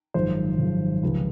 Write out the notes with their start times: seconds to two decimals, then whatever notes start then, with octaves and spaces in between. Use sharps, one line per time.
0.14 G#1 F#2 F3 G#3 C5
0.58 G#1 F#2 F3 G#3
1.03 C#2 C3 F3 G#3